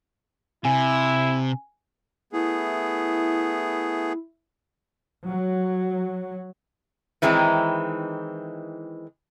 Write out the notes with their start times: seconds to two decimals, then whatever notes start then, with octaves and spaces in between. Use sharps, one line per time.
0.65 C3 E4 G#5
2.33 A3 B3 E4 G#4
5.28 F#3
7.22 D#3 E3 G#3 C4 D#4 E4